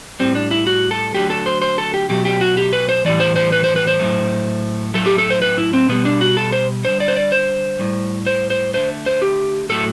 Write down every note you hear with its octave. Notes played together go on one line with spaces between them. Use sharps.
A2 G3 C4
D4
E4
F#4
A4
D3 F#3 A3 G4
A4
C5
C5
A4
G4
B2 F#3 A3 G4
G4
F#4
G4
B4
C5
A2 E3 G3 D5
C5
C5
B4
C5
B4
C5
A2 F#3 A3
A2 F#3 A3 A4
G4
A4
C5
B4
E4
C4
B2 G3 B3
D4
F#4
A4
C5
D3 G3 C5
D5
C5
D5
C5
A2 G3
C5
C5
D3 A3 C5
C5
G4
A2 F#3 A3 A4